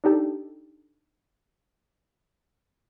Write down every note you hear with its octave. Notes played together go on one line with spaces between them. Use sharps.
D4 D#4 G4 A4